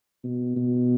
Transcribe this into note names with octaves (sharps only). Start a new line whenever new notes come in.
B2
B2